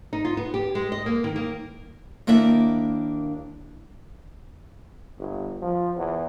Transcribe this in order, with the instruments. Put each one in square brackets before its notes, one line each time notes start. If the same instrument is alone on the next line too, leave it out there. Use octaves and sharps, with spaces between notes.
[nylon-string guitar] D#4
F4
B3
G4
G#3
D#5
A#3
D#3
A#3
D#2 A#3 D4 E4 E5
[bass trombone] G1
F3
E2